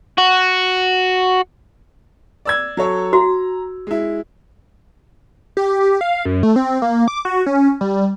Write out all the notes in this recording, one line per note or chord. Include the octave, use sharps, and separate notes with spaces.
F#4
D5 E6 G#6
F#3 A4 C#5
F#4 A#5
G#3 E4
G4
F5
F#2
A3
C4
A#3
D6
F#4
C#4
G3